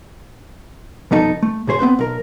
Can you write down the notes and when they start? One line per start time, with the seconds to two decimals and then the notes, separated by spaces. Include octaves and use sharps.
1.11 C2 F2 B2 D#4 A4
1.43 A3
1.67 B1 G#2 G#4 C5 C#5
1.79 B3 C4 B4 C5
1.99 B1 A#4